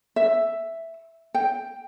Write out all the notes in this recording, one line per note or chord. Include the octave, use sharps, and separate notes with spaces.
E5
G5